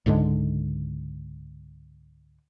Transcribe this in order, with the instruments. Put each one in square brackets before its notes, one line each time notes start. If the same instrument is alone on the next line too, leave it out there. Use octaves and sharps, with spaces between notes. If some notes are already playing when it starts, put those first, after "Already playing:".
[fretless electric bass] C#2 G#2 D3 G#3